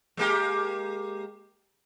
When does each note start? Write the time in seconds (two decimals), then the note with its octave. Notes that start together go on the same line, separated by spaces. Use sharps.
0.17 G#3 A#3 G4